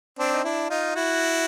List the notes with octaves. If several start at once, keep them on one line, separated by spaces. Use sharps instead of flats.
C4 D4
D#4
D4 E4
D#4 F4
E4 F#4